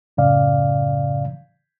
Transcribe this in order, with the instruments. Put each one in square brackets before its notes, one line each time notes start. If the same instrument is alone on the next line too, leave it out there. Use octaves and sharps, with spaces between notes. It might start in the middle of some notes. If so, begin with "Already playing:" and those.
[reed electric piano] F#2 A2 C#3 D5 F5